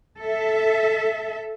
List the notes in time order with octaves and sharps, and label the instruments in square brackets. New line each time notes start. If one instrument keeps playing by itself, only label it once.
[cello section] A4 E5